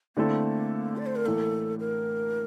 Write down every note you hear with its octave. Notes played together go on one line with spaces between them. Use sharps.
D3 A3 A#3 C4 E4 A4
D5
C5
A#4
A2 E3 A#3 A4
A#4